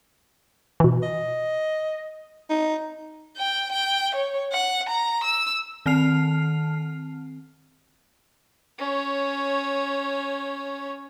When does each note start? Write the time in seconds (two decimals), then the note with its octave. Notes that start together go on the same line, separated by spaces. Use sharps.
0.80 B2 E3
1.03 D#5
2.50 D#4
3.38 G5
3.72 G5
4.15 C#5
4.53 F#5
4.89 A#5
5.24 E6
5.86 D#3 C4 A5 F6 C7 F7
8.79 C#4 C#5